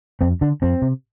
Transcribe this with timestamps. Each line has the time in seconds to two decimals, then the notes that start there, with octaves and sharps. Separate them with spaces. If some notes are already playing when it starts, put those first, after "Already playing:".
0.21 F2 C4
0.41 D3 D4
0.62 F2 C4
0.82 C3